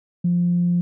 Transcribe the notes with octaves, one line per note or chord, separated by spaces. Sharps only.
F3